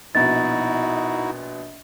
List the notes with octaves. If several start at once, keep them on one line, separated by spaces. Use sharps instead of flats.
A#1 B2 D#4 E4 F#4 A6